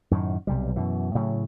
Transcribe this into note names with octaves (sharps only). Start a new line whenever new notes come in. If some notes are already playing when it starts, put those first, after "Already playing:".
F#2 A2 D#3
B1 C3 G3
F#2 B2 E3
A2 C#3 F#3